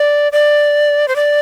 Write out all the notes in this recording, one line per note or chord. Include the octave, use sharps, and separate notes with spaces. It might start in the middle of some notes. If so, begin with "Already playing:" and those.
Already playing: D5
D5
C5
D5